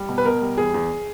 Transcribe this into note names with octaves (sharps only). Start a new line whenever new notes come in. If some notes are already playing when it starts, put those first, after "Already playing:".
Already playing: G3
B2
B4
B2 A#4
G3
E2 G#4
E2